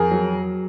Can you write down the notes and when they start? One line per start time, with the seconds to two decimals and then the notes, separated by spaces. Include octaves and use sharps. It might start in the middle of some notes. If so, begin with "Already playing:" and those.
Already playing: F2 G#4 A#4
0.11 F#3